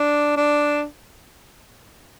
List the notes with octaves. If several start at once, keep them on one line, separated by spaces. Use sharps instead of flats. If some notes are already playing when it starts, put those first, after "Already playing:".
Already playing: D4
D4